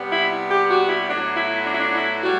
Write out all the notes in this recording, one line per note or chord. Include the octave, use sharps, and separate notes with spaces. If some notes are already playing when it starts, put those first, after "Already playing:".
Already playing: C3 G3 B3
E4
G4
F#4
E4
A2 F#3 B3 D4
E4
D4
E4
D4
E4
A2 G3 F#4